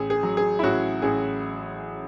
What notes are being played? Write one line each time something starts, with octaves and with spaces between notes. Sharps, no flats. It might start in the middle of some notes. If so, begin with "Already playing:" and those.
Already playing: A1 G#4
G#4
F#3
G#4
E4
A1 F#4
A1 G#4